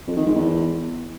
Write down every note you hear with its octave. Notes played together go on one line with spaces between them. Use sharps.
F2
D#3
G#2
E2